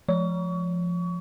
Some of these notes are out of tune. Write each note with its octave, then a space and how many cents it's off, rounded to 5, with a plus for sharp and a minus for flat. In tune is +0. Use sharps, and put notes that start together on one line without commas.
F3 +0 C#6 +30